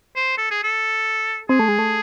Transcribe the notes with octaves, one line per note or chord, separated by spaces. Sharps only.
C5
A4
G#4
A4
C4 G#4
A3
G#3
A3